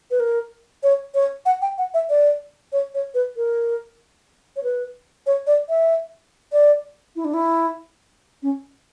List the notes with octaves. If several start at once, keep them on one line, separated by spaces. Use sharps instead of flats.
B4
A#4
C#5
C#5
F#5
G5
F#5
E5
D5
C#5
C#5
B4
A#4
C#5
B4
C#5
D5
E5
D5
E4
D4
E4
C#4